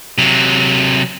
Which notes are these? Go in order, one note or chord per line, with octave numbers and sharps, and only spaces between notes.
C3 F#3